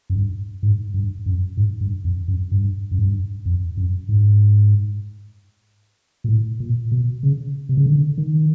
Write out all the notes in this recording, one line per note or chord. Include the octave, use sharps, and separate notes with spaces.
F#2
G2
G#2
G2
F#2
G#2
G2
F2
F#2
G2
F#2
G2
F2
F#2
G#2
A#2
A2
A#2
B2
C#3
C3
C#3
D3
D#3